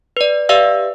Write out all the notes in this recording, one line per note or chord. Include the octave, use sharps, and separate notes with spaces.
B4 D5
G4 B4 D5 E5 F5 E6